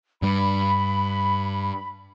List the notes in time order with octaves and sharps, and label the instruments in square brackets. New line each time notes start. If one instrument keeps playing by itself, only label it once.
[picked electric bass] G2 G3 [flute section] B5